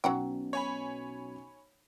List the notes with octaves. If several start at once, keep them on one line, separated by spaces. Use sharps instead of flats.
B1 B2 F#3 C#4 F#5 G5
C#5 G#5 B5